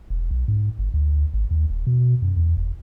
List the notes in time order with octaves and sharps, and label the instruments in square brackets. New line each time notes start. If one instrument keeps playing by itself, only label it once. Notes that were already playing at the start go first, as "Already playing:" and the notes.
[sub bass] E1
B1
G#2
G1
D2
G#1
D#2
D#1
B2
F#2
E2
F1